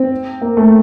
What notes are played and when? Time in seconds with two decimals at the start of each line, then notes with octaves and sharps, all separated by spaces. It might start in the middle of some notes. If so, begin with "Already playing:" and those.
Already playing: C4
0.41 A#3
0.57 A3